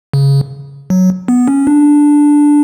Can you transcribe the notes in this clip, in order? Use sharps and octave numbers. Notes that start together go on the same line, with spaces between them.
C#3
F#3
B3
C#4
D4